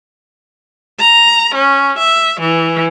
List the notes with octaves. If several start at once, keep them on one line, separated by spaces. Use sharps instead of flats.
A#5
C#4
E5
E3